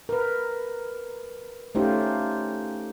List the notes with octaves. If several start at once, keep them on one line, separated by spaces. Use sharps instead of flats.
A#4 B4
A3 C#4 D#4 F4 G4 C5